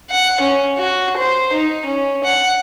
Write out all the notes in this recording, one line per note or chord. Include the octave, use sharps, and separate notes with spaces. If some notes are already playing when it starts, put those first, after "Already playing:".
F#5
C#4
F#4
C5
D#4
C#4
F#5